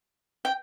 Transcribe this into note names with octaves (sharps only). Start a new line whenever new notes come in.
G5